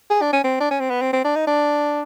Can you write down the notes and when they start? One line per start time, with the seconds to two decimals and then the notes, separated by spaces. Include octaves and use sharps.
0.10 G#4
0.22 D4
0.33 C#4
0.44 C4
0.61 D4
0.71 C#4
0.80 C4
0.90 B3
1.02 C4
1.13 C4
1.24 D4
1.36 D#4
1.47 D4